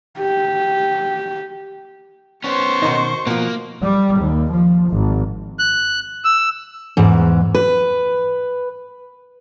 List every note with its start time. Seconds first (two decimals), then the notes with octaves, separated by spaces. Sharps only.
0.19 G4
2.44 B3 C#4 C5 C#6
2.82 B2 D#3 D#4
3.27 B2 F3 A#3
3.82 G3
4.21 D#2
4.51 F3
4.89 G#1
5.59 F#6
6.25 E6
6.97 E2 G#2
7.55 B4